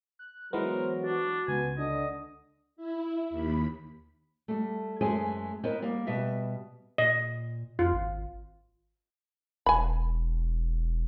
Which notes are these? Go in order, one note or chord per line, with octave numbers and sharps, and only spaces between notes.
F#6
E3 F#3 G#3 B3 A#4 C5
D4 F#4
C#2 B3 G#5
D3 D4 D#5
E4
D#2 B5
G3 A3
F#2 G#3 A3 G#4 C5 G#5
B3 E4 A#4 C5 D#5
G3 A#3
B2 G3 B3 E5
A#2 D#5
F2 F4
G#1
E1 G#5 B5